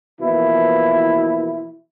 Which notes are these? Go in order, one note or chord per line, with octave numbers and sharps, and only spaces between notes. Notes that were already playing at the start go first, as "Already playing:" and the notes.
B2 E3 F3 A#3 E4